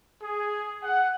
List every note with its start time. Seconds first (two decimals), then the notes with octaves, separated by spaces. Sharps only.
0.22 G#4
0.83 F#5